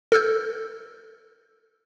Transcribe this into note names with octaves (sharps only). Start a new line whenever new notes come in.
A4 E6 F6 G6